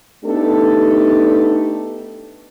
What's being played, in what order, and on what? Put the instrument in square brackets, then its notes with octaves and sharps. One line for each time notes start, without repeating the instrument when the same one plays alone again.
[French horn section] A3 B3 D4 D#4 G4 A4